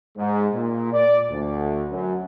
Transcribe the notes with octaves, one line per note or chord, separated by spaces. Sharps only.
G#2
A#2
D5
D2
F#2